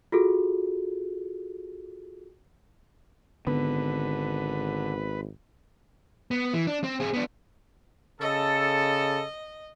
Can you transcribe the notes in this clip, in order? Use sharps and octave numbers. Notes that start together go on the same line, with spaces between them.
F4 F#4 G#4 A4
G#1 D3 B3 B4
B3
E3
D4
C4
C4 G#4
B3 D4
C#3 A4 D#5